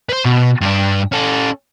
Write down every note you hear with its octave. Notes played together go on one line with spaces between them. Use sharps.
B4 C5
B2
G2 D4
C#4 A4